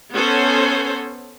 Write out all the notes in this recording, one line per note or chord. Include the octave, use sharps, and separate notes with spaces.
B3 C#4 A4 C5 C#5